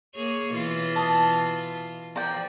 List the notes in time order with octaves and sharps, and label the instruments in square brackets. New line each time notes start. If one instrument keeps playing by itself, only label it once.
[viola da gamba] A#3 G#4 C#5
B2 E3 F4
[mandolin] A5 D#6
[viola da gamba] F3 [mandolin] A#4 D5 G5